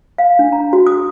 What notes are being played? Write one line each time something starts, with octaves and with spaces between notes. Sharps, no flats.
F5
D4
A#5
F#4
D#6